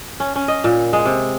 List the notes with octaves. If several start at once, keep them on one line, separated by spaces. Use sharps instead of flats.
C#4
C#4
D#5
A#2
G#3
C3